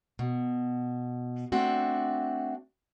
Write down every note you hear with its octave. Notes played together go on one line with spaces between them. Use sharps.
B2
A3 C4 D4 F#4